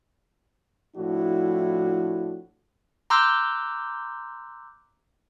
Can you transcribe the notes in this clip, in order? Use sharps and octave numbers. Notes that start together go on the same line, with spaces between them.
A2 F3 D4 E4 F#4
A#5 C6 D6 E6 F#6 G6